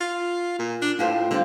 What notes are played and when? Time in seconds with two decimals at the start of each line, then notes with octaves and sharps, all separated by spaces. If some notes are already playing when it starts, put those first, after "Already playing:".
0.01 F4
0.59 A#2
0.82 D4
0.99 A2 F4 G4 C5
1.31 D3 G3 C4 F4